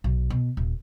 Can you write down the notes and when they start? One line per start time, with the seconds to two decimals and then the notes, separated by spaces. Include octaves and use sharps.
0.04 B1
0.30 B2
0.57 D#1